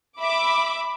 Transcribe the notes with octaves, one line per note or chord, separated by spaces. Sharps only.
E5 B5 D6